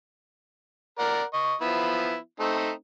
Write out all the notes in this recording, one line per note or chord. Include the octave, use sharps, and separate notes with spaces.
A#4 D5 F#5
D#5 C#6
F3 B3 E4
A3 C4 D#4